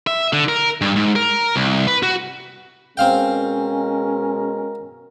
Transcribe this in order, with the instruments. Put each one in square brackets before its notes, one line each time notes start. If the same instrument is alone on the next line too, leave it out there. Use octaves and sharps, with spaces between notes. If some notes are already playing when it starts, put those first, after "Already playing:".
[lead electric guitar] E5
D3
A#4
G2
G#2
A#4
C2
B4
F#4
[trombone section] B2 G#3 A#4 [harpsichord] C4 F5 G5 [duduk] C#4